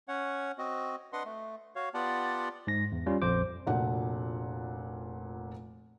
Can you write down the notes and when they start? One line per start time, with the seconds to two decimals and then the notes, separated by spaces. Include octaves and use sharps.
0.08 C#4 C#5 F#5
0.58 C4 F#4 D#5
1.13 D4 B4 D#5 F#5 C6
1.25 A3
1.75 F#4 C#5 F5
1.94 B3 F4 G4 D5 F#5 A5
2.67 G#2 A#6
2.92 E2
3.06 G3 C#4 F4
3.22 A#1 F2 C5 D6
3.67 F1 A#2 D4 F#4 F#5